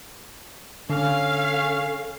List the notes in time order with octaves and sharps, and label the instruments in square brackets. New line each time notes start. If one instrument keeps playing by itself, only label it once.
[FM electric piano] D3 [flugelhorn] C#4 [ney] A4 [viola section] F5